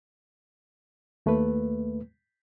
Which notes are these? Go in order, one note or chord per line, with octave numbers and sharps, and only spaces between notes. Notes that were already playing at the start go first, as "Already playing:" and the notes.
D#2 A3 A#3 B4